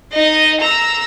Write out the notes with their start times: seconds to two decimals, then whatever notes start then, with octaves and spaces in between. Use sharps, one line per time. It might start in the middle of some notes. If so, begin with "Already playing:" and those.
0.12 D#4 D#5
0.60 A#5 E6